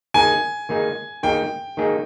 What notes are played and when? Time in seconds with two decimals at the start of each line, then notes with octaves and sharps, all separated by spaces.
0.14 D#3 A#3 D#4 G#4 G#5
0.69 D#3 A#3 D#4 G#4
1.23 D#3 A#3 D#4 G#4 G5
1.77 D#3 A#3 D#4 G#4